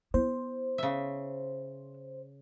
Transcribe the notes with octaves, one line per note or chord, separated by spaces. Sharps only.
B3 E4 C5
C#3 E5